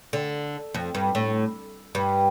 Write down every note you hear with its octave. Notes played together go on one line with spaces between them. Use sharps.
D3
F2
G2
A2
G2